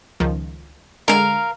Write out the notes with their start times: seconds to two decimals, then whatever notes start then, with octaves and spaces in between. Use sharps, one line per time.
0.20 C#2 D#3 F3
1.08 D3 G#3 A#4 F5